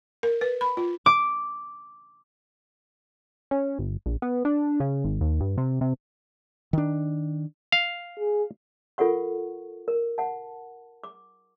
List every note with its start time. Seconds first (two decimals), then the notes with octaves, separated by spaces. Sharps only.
0.23 A#4
0.41 B4
0.61 B5
0.77 F4
1.06 D6
3.51 C#4
3.79 G1
4.06 A#1
4.22 B3
4.45 D4
4.80 C#3
5.04 G#1
5.21 D#2
5.41 G2
5.58 C3
5.81 C3
6.73 D#3 D4
7.72 F5
8.19 G#4
8.98 F4 A4 A#4 F#5 C#6
9.88 A#4
10.18 F#5 A5
11.04 D6